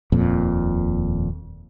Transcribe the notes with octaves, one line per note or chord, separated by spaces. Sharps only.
D#1 F2 A#2